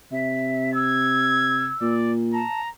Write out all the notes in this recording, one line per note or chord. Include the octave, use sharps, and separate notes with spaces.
C3 E5
E6 G#6
A#2 D5
A5 A#5